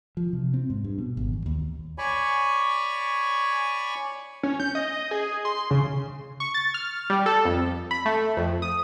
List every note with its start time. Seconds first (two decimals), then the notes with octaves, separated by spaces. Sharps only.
0.17 F3
0.33 C3
0.54 C4
0.70 G#2
0.84 G2
0.98 B2
1.17 G#1
1.33 A1
1.46 D#2
1.98 C#5 D5 G#5 B5 C#6
4.43 C#4
4.60 G6
4.75 D#5
5.11 G#4
5.45 C6
5.71 C#3
6.40 C#6
6.54 A6
6.74 F6
7.10 G3
7.26 A4
7.45 F2
7.91 B5
8.05 A3
8.37 F2
8.62 D#6